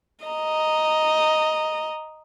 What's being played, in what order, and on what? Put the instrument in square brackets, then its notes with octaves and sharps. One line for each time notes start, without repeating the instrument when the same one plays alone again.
[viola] D#5 A#5